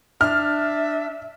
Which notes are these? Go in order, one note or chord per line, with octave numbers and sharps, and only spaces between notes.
D4 E5 F6